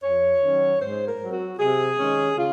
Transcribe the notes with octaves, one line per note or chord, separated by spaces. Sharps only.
F2 C#5
D#3 F#3 C#4
G#2 C5
A#4
F#3 C4
F#4
C3 G#4
D#3 G#3 C#4
C#3 F4